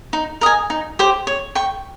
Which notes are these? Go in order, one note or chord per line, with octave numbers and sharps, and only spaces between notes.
D#4
A#4 D#5 G#5
D#4
G4 C5
C#5
G5 C#6